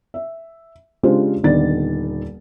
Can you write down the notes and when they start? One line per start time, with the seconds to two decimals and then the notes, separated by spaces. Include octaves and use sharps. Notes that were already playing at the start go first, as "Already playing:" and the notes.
0.14 E5
1.03 C#3 G#3 D4 F4 G4 C5
1.44 D#1 D3 D#3 B3 D5 A6